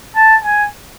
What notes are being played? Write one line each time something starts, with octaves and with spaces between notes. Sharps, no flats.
A5
G#5